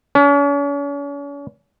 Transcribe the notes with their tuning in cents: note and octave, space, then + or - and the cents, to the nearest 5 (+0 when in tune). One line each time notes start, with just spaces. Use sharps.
C#4 +40